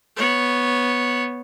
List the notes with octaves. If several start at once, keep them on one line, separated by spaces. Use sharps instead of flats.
B3 C#5